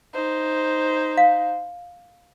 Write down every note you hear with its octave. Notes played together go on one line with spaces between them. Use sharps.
D#4 C5
F5